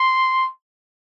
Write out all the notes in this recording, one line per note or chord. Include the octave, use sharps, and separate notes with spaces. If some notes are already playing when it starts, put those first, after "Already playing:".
Already playing: C6